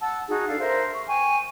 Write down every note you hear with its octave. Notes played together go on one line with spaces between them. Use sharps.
F#5 A5 E6
D#4 F#4 G#4
D4 A4 F5
A#4 C5 E5
C#6
G5 G#5 C#6